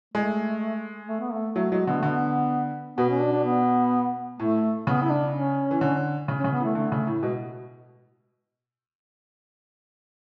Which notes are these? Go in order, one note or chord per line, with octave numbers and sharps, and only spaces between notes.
G#3 A3
A3
B3
A3
F#3 A3
F#3 G#3
D3 B3
A3
D3 B3
B2 B3
C#4
D4
D4
B3
A2 A3
C#3 B3
E4
D4
C#4
E3
D3
C#3
C#4
C#3
B3
E3 A3
D3 A3
C#3
A2
B2 G#3